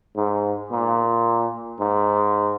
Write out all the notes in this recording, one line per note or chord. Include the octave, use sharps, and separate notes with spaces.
G#2
A#2
G#2